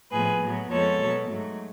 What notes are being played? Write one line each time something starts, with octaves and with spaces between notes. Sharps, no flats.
A2 F3 B3 G#4 B4
A2 F#3 B3
F2 F3 G#3 B3 A4 C#5
B2 F#3 B3
G#2 F#3 A3